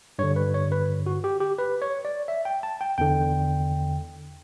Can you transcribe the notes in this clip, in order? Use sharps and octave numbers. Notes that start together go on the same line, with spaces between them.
G2 D3 C#5
B4
C#5
B4
F#4
G4
G4
B4
C#5
D5
E5
G5
A5
G5
E2 D3 G5